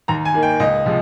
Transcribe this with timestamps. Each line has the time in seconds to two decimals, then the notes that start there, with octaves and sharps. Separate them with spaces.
0.08 D#2 A#5
0.25 G#5
0.34 D#3 A#3
0.43 G5
0.60 C#2 D#5
0.86 C3 F3 G#3